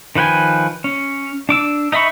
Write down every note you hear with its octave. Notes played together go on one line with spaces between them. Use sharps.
D#3 F3 B4 G5 G#5
C#4
D4 D6 E6
D#4 D#5 E5 B5 C#6